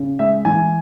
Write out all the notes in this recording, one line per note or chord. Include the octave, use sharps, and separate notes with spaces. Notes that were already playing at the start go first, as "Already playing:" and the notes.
Already playing: C#3
G#3 E5
E3 G#5